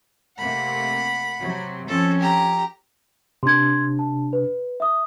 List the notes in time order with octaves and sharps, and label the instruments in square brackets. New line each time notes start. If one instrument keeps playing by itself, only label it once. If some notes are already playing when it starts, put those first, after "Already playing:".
[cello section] C3 A3 A#3 [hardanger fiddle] F#5 B5
[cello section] C3 F#3
[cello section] F3 C4 C#4 [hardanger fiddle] A4
[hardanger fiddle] G4 A#5
[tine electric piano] C3 D4 [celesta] C6 G#6
[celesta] A5
B4
E5 D#6